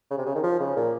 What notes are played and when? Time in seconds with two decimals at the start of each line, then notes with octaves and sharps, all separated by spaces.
0.11 C#3
0.18 C3
0.26 C#3
0.35 D#3
0.43 F3
0.60 C#3
0.77 A#2